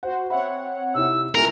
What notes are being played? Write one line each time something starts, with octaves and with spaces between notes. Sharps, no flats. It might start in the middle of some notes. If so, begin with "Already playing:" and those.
F#4 C5 F#5
C4 C#5 E5 F#5 B5
C3 D#4 E4 E6
C#2 A3 E4 A#4 F#5 G#5 F7